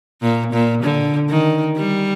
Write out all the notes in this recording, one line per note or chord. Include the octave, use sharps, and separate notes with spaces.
A#2
A#2
D3
D#3
G3